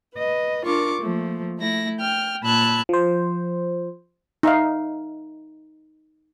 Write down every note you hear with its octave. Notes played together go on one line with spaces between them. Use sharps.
B4 D#5
D4 F4 A#4 C#6 D6
F3 A3 A#3
A3 E4 A#6
G5 F6
A#2 A5 B5 E6 F#6 G#6
F3 C5
D#4 E5 F5